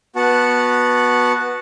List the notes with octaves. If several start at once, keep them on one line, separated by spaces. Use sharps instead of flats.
B3 F#4 F#5 A5